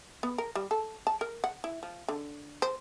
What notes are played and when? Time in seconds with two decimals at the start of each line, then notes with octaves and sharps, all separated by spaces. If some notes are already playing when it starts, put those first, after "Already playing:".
0.23 B3
0.38 A#4
0.55 G3
0.71 A4
1.07 A5
1.21 A#4
1.44 F#5
1.64 E4
1.83 F3
2.08 D3
2.62 C5